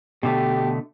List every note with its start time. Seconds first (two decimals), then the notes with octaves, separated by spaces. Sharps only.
0.23 B2 D3 A3 G4